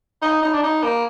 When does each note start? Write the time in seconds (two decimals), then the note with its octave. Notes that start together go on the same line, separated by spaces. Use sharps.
0.22 D#4
0.42 D#4
0.54 D4
0.63 D#4
0.83 A#3